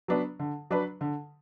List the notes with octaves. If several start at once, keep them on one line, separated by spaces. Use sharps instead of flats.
F#3 B3 D4 B4
D3
F#3 D4 B4
D3